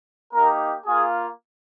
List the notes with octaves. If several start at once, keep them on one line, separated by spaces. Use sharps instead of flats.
A#3 D#4 G4 A#4
A#3 F4 G#4